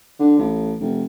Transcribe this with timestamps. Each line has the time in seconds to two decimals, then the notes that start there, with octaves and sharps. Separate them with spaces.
0.19 D3
0.38 A1
0.80 F1